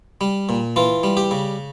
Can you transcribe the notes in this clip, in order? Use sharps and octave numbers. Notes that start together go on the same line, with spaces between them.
G3
A#2
E3 F4
G3
G4
C#3